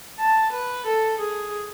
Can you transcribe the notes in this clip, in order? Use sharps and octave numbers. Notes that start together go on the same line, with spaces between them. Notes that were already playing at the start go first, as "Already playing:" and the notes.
A5
B4
A4
G#4